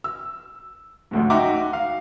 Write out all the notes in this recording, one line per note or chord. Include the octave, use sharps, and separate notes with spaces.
E6
A1 D2 G#2
D#4 F#4 E5 G5 A#5 D6
F5